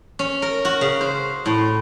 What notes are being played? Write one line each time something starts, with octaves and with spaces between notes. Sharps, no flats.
C#4
A#4
F#4
C#3
C5
A2